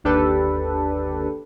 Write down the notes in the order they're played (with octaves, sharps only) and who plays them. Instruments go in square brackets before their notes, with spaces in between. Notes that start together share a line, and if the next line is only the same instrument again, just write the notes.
[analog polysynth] G1 D#2 D4 G4 A4 B4